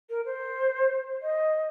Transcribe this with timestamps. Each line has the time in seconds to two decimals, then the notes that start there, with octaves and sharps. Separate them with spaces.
0.09 A#4
0.25 C5
1.22 D#5